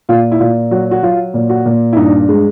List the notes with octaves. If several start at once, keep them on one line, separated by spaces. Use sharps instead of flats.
A#2 F4
E4
A#2 F4
F#3 F#4
F#4
F#3 F4
A#2
F#4
A#2
E4
G2 D#4
G#3